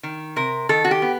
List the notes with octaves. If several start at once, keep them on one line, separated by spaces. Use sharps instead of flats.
D#3
C3 A#4
D#3 A4
F#4
G4
B3